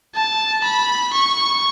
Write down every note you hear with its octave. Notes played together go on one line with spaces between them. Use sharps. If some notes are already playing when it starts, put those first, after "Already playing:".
A5
B5
C#6